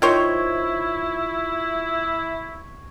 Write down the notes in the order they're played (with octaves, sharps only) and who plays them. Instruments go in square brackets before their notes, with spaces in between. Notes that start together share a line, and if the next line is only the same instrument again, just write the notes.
[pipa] D#3 C5 C#5 [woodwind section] E4 [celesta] F4 [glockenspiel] C#6 G#6